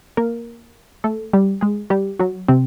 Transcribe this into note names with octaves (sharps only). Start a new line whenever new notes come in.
A#3 A#4
A3 A4
G3 G4
G#3 G#4
G3 G4
F#3 F#4
C3 C4